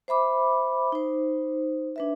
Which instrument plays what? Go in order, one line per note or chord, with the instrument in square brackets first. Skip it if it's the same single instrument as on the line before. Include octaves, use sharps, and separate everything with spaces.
[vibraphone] C5 E5 B5 D6
D#4 C5
D4 B4 E5